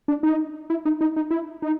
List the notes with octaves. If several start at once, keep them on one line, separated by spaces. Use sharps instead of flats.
D4
D#4
E4
D#4
D#4
D#4
E4
D#4